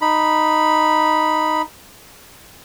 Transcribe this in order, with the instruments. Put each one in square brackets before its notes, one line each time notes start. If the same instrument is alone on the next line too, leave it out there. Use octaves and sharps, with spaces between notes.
[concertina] D#4 B5